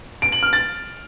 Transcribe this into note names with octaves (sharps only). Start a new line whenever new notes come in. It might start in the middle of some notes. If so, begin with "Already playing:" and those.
D7
F#7
F6
A6